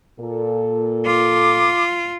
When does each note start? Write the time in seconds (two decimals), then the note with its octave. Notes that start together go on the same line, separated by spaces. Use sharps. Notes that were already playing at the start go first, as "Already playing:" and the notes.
0.20 A#2 A4
1.06 F4 D6